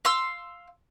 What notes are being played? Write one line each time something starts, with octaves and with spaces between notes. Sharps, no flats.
F5 C6 E6